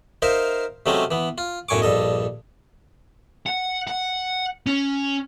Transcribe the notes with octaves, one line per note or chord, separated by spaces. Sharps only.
D#4 A#4 C5 E5 F5
C3 F#3 G#3 A3 C4 C#4
E3 B3
F4
B1 F#2 A2 G#5 C#6 D6
A#1 G2 A4 D#5
F#5
F#5
C#4